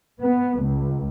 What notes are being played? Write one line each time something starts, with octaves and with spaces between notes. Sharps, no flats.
B3
C#2